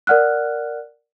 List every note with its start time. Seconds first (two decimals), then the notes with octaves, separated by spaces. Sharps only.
0.07 A#4 D5 F#5 F6 F#6